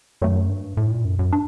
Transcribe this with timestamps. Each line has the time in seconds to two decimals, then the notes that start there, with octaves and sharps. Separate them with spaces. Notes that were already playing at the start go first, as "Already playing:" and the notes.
0.22 F#2 D#3 F#3 A3
0.49 G2
0.77 A2
0.91 A#2
1.05 F#2
1.19 F#2
1.33 D4